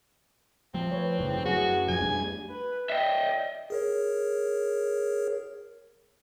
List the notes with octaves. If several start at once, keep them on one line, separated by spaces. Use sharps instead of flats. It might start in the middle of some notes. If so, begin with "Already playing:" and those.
F3 F#3 A3 C4
B4 C#5
F#1 G2 C#3 E4
F#2 F#4 G#4
B1 F2 F3 G#5
F2 G3 A3 D4
B4
D#5 E5 G5
G#4 A#4 C#5